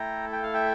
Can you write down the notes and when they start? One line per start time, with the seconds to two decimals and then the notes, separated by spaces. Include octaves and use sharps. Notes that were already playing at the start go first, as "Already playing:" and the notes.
Already playing: A3 E4 A4 G5 A#5
0.32 G5
0.43 F5
0.54 E5 G5